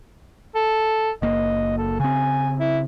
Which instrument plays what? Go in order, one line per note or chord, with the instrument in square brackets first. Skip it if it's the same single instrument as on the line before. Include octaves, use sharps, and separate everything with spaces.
[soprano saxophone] A4
[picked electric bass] F#1 A#3 [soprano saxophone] D#5
[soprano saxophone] A4
[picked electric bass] C#3 C4 [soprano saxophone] G#5
[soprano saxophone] E4